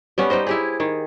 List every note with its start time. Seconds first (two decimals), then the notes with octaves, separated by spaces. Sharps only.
0.18 G3 B3 C#4
0.30 G3 D#4 C5 D#5
0.47 E4 G4 G#4
0.80 D#3